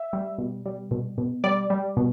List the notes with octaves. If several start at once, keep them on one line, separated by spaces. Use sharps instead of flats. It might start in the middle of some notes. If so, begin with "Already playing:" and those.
Already playing: E5
G3
B2
G3
B2
B2
G3 D5
G3
B2